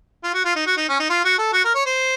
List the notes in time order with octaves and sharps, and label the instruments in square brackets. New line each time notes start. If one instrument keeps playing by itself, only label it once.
[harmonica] F4
F#4
F4
D#4
F#4
D#4
C#4
D#4
F4
F#4
A4
F#4
A#4
C#5
C5